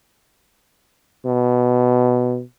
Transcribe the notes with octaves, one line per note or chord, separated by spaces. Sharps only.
B2